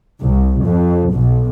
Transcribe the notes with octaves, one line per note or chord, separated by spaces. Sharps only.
C2
F2
B1